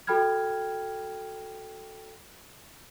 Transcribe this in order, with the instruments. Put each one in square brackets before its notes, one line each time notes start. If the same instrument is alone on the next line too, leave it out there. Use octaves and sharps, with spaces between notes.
[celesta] F#4 A4 G5 B5 F6 G#6